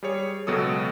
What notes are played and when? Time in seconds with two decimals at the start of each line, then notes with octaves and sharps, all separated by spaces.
0.03 G3 G#4 C#5
0.47 C#2 B2 F#3 A4 D#6